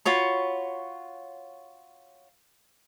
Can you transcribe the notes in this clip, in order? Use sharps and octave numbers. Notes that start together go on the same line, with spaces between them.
F4 F#4 C#5 B5